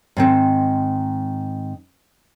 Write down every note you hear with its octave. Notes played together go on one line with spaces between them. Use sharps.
G#2 D#3 C4